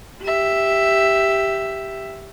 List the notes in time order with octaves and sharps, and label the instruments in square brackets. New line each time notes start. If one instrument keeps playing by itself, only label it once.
[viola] G4 E5